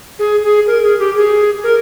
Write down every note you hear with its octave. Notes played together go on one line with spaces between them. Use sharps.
G#4
G#4
A#4
G#4
G4
G#4
A#4